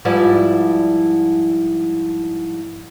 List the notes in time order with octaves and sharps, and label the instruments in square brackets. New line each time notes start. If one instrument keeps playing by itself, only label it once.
[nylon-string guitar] G#2 F3 G3 E4 B4 D5